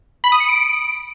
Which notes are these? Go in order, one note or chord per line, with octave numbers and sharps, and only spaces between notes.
B5
D#6
C#7
D7